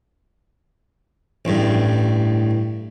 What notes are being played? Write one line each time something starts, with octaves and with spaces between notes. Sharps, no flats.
A1 G2